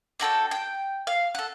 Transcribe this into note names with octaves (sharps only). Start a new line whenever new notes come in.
D4 F#4 A4 G5
G5
F5
A4 F#5